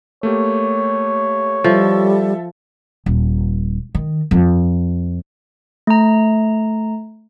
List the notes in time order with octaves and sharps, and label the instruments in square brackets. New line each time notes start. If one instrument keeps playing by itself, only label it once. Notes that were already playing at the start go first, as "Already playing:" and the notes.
[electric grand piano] A3 A#3 G4 [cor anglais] C#5
[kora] F3 [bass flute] G3 [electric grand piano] A4 E5
[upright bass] D#1
D#3
F2
[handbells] A3 A#5